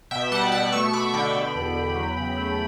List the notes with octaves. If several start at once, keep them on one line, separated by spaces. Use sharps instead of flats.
B2 E5 G5
G3 F#5 A5
B2 F#5 A5
A3 C#6 E6
A3 B5 D6
D3 G5 B5
B2
E2
E2
F#3
C#3
A3